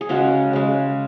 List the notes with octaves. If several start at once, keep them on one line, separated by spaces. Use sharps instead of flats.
G#4
C#3 G#3 C#4 F#4
C#3 G#3